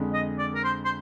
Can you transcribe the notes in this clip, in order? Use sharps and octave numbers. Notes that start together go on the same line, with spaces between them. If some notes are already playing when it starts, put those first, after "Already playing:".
Already playing: F2 D3 G#3
D#5
D5
A#4
C5
C5